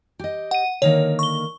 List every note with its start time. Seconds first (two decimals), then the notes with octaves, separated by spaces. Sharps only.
0.19 G4 D#5
0.51 F#5 D#7
0.82 D3 D#3 A#3 C#5
1.19 C#6 G7